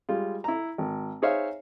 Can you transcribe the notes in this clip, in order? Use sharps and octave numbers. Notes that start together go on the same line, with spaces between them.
G3 G#3 F4
E4 A#5
G#1
D#4 G#4 C5 C#5 E5 F5